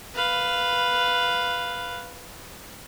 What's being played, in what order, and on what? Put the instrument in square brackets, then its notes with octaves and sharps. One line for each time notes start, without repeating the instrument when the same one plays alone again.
[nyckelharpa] B4 F5